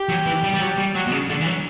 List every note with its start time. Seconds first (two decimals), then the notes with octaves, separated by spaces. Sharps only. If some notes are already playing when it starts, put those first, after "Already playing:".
Already playing: G4
0.09 F#3
0.26 E3
0.43 G3
0.53 G3
0.60 F#3
0.78 G3
0.95 F#3 F#4
1.07 B2
1.11 C#3
1.21 D4
1.29 D3
1.41 E3
1.46 F#3